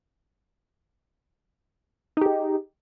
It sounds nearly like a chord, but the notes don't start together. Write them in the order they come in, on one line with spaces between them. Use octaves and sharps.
D#4 G4 G#4